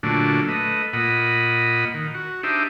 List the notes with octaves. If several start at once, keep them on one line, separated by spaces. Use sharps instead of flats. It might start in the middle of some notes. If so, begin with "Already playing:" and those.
A#2 D3 F#3 A3 D4
A3 B4 D#5
A#2 D#5 F#5 B5
D#3
F#4
D4 D#4 G4 C5 E5